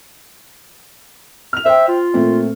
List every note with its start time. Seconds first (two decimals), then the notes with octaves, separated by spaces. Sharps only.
1.53 F6 F7
1.65 C5 E5 G5
1.88 F4
2.14 A#2 A3 C4